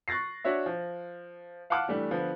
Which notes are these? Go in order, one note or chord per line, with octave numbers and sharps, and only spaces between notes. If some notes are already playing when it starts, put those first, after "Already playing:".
C#6 F#6 A6 A#6 C7
D4 F#4 C#5 E5
F3
F5 F#5 A5 D6 F6 F#6
E3 G3 A3 D4
D3 F3 B3